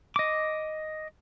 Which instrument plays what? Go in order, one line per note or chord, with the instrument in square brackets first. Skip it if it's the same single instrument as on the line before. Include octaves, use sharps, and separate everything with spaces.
[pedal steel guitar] D#5 D6